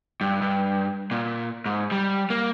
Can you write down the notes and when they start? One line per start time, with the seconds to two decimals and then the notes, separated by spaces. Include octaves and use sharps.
0.21 G2
0.42 G2
1.11 A#2
1.66 G#2
1.91 G3
2.30 A#3